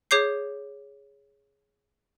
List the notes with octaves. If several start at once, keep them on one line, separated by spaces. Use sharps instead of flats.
G#4 C#5 D6 G6 C7